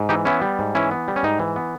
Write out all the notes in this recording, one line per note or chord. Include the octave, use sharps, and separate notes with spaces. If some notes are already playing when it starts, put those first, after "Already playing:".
Already playing: G#2
E3 D#4 G4
B3 C#4 E4
G3
G#2
E3 C#4 E4
B3
G3
C#4
G#2 D#4
E3
B3